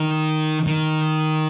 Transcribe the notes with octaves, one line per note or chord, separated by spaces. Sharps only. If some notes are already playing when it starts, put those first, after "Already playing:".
Already playing: D#3
D#3